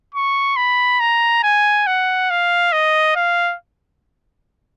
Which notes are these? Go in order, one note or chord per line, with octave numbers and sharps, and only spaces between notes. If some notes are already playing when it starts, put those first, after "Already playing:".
C#6
B5
A#5
G#5
F#5
F5
D#5
F5